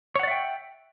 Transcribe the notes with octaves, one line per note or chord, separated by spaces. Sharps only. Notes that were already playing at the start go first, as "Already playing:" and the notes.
C#5 D5 E5 F#5 G5